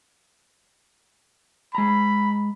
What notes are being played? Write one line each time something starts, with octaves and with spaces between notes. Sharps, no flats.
G#3 A#5 B5